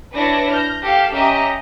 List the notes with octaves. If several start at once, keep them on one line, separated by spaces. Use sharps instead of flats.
D4 E4 B4 C#5 D5 A#6
F6 G6 A#6
G4 A4 F5
C#4 G4 D#5 E5 A#5